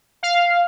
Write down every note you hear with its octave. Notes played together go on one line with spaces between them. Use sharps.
F5